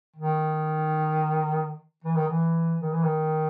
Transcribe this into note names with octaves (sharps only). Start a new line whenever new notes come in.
D#3
E3
D#3
E3
D#3
E3
D#3